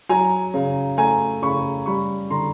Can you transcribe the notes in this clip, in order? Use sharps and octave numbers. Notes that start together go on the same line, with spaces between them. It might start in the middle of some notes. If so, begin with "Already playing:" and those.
F#3 G#5 A#5
C#3
A3 G#5 A#5
C#3 B5 C#6
G3 B5 C#6
D3 A#5 C6